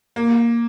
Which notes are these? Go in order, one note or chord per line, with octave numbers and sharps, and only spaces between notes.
A#3